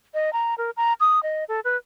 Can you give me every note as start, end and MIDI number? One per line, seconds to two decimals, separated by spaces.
0.14 0.33 75
0.33 0.54 82
0.58 0.70 70
0.77 0.93 82
1.00 1.22 87
1.23 1.44 75
1.49 1.60 69
1.64 1.77 71